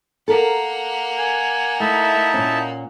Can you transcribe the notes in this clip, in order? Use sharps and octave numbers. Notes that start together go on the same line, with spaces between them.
A#3 A4 A#4 F#5
G#5
A3 D#4 E4 E5 A5
A#2 C#4